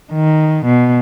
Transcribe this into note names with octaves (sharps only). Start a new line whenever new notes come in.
D#3
B2